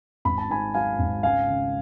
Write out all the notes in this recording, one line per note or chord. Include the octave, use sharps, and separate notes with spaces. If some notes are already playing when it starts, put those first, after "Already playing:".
G#1 B5
A5
G#2 G#5 B5
F#3 F5 G#5
G#1
C#2 F5 G#5
C#3